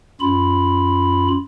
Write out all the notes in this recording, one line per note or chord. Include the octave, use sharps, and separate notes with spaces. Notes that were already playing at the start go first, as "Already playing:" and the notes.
F#2 F4 B5